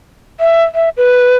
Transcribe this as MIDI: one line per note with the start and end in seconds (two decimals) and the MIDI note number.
0.40 0.63 76
0.75 0.89 76
0.97 1.38 71